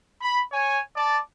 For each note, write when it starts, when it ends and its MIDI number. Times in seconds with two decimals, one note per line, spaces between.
0.22 0.40 83
0.52 0.79 73
0.52 0.79 80
0.96 1.19 74
0.96 1.19 81